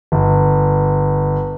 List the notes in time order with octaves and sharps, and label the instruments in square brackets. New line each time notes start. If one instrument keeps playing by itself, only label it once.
[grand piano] G1